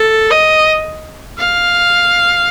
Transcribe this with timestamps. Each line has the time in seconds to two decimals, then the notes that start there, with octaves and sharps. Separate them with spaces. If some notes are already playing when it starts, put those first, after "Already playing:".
Already playing: A4
0.30 D#5
1.39 F5